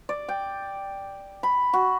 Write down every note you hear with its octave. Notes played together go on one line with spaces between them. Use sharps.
D5
G5
B5
F#4